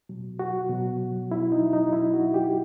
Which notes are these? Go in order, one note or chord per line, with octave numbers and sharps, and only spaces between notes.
B2 F#3
F#4
B2 F#3
B2 F#3 E4
D#4
D#4
B2 F#3 E4
F#4
G4